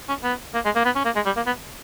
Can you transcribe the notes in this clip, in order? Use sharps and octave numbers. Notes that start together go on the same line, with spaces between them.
C#4
B3
A#3
G#3
A#3
B3
C#4
A#3
G#3
G3
A#3
B3